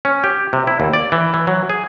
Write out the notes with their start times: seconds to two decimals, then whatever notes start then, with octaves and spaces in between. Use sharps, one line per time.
0.05 C#4
0.24 G4
0.53 C3
0.67 E4
0.80 D#2
0.93 D5
1.12 E3
1.34 E3
1.47 F#3
1.69 G#4